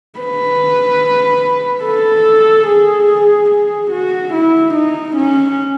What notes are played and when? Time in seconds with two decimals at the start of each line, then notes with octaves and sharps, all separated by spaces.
0.19 B4
1.84 A4
2.68 G#4
3.50 G#4
3.91 F#4
4.33 E4
4.74 D#4
5.16 C#4